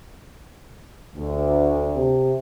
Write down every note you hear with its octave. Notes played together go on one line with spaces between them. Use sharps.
D2
C3